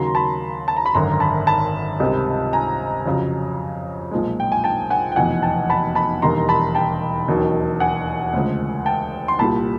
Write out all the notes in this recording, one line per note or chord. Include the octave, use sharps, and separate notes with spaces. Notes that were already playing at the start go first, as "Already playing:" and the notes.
Already playing: D#2 C#3 F#3 A#5 C6
A5 B5
A5
A#5
B5
G#1 F#2 D3 A#5 C6
A5 B5
A5 B5
C#2 C3 D#3 G3
G#5 A#5
F2 C#3 F#3
B1 A#2 F3 G#3
G5
G#5
G5 A5
F#5 G#5
G5
F1 E2 B2 F#5 G#5
G5 A5
A5 B5
A5 B5
E1 D#2 D#3 G3 A#5 C6
A5 B5
G5 A5
E1 D#2 D#3 F#3
F#5 G#5
D2 C#3 F3 G#3
G5 A5
C6
C2 A#2 G3 A5 B5